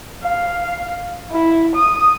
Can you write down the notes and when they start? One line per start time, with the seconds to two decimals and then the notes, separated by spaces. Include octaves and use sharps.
0.23 F5
1.31 E4
1.75 D#6